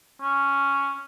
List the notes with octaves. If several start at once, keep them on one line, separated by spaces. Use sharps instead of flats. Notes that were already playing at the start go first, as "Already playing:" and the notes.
C#4